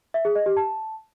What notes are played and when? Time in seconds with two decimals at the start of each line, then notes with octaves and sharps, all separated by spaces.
0.14 E5
0.25 G#4
0.35 D#5
0.46 G4
0.57 A5